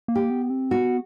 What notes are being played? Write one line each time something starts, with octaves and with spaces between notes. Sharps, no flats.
A#3
G4
B3
C4
B3 F#4